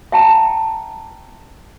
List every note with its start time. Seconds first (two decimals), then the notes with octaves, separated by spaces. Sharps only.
0.12 E5 G5 A5 A#5